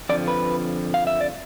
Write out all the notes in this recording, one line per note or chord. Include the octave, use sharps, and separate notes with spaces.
F2 D3 F3 D5
B4
F5
E5
D5